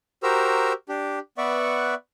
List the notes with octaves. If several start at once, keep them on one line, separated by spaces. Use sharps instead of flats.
F#4 G4 A#4 C5 A#5 E6
D4 G4
B3 B4 D5 E5 F#5 C#6